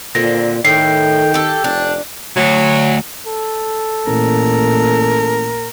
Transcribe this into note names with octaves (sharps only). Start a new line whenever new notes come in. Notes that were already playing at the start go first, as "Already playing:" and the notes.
A#2 D3 D#3 C4 A#6
A2 D#3 G5 C7
G4 A4
F1 D4
D2 F#3
A4
A1 A#2 A#4